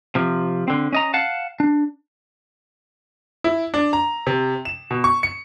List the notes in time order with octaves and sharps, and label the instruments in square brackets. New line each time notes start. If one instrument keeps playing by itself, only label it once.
[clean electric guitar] C3 F3
D3 C4
C#4 D#5 A#5
F5 F#5 A5
D4
[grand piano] E4
D4
A#5
C3
E7
B2
C#6
C#7